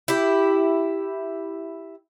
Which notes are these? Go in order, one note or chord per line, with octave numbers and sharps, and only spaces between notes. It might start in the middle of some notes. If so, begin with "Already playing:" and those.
E4 G4